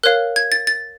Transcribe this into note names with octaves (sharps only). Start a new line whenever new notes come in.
A#4 C#5 F5 F#6
G#6
A6
A6